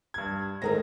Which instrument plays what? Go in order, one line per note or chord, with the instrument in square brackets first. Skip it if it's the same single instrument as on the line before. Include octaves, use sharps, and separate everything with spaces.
[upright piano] G2 G#6
[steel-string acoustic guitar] G#2 D#3 A3 [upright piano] A#5 A#6